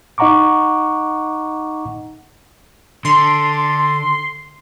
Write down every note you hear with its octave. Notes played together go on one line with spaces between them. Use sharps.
D#4 D#5 F#5 A#5 C#6 D6
D3 C6